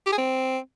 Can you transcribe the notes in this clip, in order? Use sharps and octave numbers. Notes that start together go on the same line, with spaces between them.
G4
G#4
C4